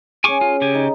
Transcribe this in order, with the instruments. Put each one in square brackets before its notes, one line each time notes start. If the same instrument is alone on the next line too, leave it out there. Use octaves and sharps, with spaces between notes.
[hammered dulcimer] C#4 G#4 [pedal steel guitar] G#5 C#6 D6
[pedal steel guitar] F4
C#3 G4 G#5
[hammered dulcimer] D#4